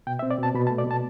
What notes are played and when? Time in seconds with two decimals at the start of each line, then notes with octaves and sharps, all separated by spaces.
0.07 B2 G5
0.19 E5
0.23 C4
0.31 D5
0.38 B2 A5
0.55 B2 B5
0.67 A5
0.70 A3
0.78 D5
0.87 B2 A5